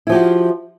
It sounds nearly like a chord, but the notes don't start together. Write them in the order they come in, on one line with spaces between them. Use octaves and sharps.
E4 F3 G4 F#4